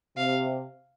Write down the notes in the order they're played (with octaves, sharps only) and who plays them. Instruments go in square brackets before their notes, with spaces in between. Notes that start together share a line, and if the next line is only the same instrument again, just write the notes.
[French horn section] C3 [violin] F5